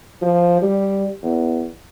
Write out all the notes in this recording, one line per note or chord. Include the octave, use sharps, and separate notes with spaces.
F3
G3
E2